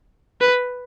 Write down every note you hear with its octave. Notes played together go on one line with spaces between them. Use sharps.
B4